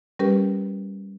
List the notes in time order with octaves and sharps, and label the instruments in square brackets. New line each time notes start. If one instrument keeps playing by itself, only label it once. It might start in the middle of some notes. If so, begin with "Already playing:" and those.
[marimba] G3 C#4 G4 A#4 B4